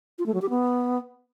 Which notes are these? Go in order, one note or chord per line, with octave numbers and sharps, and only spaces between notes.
F4
A3
F#3
G4
B3